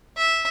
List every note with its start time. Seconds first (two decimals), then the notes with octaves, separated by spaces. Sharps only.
0.17 E5